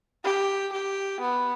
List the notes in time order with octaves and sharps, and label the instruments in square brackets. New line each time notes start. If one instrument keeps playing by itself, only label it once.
[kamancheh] G4
G4
B3